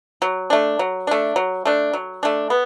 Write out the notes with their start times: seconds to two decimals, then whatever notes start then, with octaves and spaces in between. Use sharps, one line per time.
0.22 F#3
0.50 A3 D4
0.79 F#3
1.07 A3 D4
1.36 F#3
1.65 A3 D4
1.93 F#3
2.23 A3 D4
2.50 B3